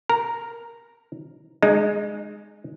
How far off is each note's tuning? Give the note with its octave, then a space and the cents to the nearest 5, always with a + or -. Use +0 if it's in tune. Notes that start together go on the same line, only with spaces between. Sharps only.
A#4 +0 A#5 +0
G#3 +0 D#4 -30